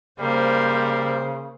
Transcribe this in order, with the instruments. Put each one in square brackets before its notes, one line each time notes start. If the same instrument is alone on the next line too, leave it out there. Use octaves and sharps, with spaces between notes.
[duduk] C#3 [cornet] G3 [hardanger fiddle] A#3 [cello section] C5